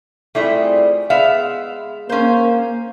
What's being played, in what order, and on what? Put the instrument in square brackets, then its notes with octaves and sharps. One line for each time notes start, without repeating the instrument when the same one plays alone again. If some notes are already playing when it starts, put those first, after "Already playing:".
[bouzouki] F3 G3 C4 [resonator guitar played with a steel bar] A3 E4 G#4
[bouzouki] G#3 [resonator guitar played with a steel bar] B3 E5 F5
[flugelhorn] A#3 [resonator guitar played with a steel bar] C#4 C5